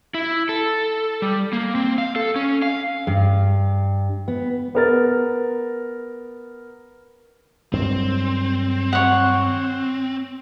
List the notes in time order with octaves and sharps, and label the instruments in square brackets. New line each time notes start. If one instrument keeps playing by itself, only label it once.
[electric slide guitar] E4
A4
G3
A#3
C4
F5
A4
C#4
F5
[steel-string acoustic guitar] G2
B3
[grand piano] B3 A#4 A6
[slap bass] G2 D#3 F#3 [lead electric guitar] C4
[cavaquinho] C#5 F#5